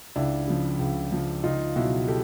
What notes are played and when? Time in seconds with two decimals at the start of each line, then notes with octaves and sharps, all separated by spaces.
0.16 C#2 D4 E4
0.48 C#3 F3
0.79 C#2
1.12 C#3 F3
1.43 C#2 D#4 F4
1.76 B2 F#3 E4 F#4
2.08 G4 A4